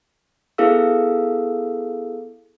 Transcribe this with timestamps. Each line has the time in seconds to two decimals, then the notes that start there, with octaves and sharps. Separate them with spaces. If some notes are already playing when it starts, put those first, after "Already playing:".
0.58 B3 E4 G#4 A4 F5 E6